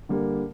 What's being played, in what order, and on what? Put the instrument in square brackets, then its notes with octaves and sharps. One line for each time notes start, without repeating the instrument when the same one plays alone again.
[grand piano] D3 G3 A#3